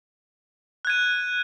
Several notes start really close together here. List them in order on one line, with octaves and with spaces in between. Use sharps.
F#6 G#6 D#7